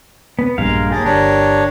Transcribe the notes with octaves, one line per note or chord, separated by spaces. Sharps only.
B3
A#1 G2 G#3 A#4 F5
D#2 G4 G#4 A#4 A5
G1 D4 C#5